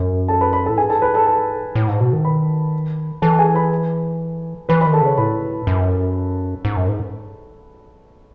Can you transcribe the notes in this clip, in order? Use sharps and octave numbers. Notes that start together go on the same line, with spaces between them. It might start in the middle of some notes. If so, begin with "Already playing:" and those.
Already playing: F#2
A4 A5
B4 B5
B4 B5
A2 A4 A5
G#2 G#4 G#5
A4 A5
B4 B5
A4 A5
A4 A5
A2
G#2
B2
D#3
B4 B5
E3 A4 A5
G#4 G#5
B4 B5
E3 B4 B5
D#3 B4 B5
A4 A5
C#3 C#5
A2 B4 B5
F#2
G#2
F#2
G#2